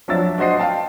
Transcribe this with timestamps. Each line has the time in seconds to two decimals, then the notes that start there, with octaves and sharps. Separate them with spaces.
0.08 F3 F#3 D4 E5 E6 A6
0.38 D4 F#4 C5 D#5 C7
0.59 F5 G5 A5